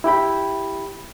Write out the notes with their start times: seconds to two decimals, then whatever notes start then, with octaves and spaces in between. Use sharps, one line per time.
0.04 E4 G4 G5 B5